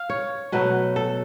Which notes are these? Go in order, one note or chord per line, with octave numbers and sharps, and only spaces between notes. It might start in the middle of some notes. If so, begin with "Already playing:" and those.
Already playing: F5
C#5
B2 F#3 A3 B4
A4